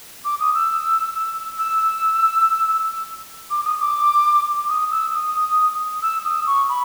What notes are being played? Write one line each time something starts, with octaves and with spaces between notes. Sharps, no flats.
D6
D#6
E6
E6
D6
D#6
D6
D#6
E6
D#6
E6
D#6
C#6
B5